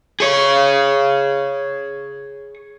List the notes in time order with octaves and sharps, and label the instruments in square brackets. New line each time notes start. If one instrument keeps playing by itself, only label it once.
[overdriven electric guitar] G#4 C#5